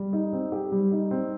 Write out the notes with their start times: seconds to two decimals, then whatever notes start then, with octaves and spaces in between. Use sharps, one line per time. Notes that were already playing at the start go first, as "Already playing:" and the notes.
Already playing: G3
0.13 D#4
0.33 C4
0.52 G4
0.72 G3
0.92 D#4
1.11 C4